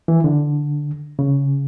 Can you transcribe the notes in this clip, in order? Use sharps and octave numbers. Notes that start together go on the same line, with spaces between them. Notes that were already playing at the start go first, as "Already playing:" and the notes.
E3
D3
C#3